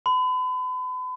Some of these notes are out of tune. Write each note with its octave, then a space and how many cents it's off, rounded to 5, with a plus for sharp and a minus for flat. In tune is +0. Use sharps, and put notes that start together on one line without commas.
B5 +40